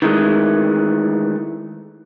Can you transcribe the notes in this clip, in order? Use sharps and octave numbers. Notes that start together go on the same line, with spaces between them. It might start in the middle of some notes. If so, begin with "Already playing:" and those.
D#3 E3 G#3 A3